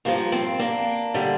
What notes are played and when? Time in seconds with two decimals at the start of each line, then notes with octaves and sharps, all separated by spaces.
0.05 G2 F3 A#3
0.32 C4
0.59 A#3 D4
1.14 D3 G3